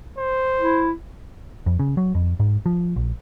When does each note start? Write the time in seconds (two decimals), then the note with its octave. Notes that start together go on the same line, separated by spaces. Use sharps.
0.18 C5
0.59 E4
1.66 F2
1.79 C#3
1.97 F#3
2.15 F2
2.40 G#2
2.66 F3
2.96 A#1